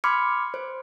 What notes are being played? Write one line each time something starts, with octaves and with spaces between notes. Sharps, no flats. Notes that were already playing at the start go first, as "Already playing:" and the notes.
B5 C6 D6 F6 G#6 C#7
C5